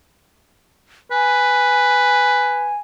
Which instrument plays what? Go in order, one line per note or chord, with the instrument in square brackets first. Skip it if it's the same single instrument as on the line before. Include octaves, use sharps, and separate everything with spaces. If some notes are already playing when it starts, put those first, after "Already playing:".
[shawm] B4 [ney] G#5